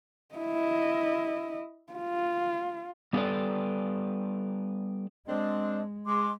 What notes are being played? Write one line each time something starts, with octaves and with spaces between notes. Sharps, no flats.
E4 D#5
F4
G3 B3 G4 A4 B4 D5
G#3 C4 D4 D#5
G#3 C6 D6